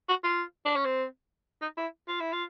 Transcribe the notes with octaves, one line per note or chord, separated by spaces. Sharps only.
F#4
F4
D4
C#4
C4
D#4
E4
F4
E4
F4